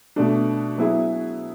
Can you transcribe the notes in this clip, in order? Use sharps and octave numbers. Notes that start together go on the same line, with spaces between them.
B2 A3 D4
F#3 B3 E4 G#4